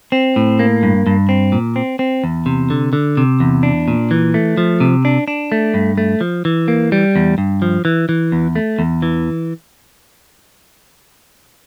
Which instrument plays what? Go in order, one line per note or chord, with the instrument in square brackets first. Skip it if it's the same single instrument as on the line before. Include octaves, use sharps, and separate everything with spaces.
[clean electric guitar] C4
A2
A#3
G2
G2
C4
A#2
C4
C4
E2
C3
D3
D3
C3
E2
D4
A#2
E3
A3
F3
C3
D4
D4
A3
G2
A3
F3
E3
A#3
G3
E2
G2
F3
E3
E3
E2
A3
E2
E3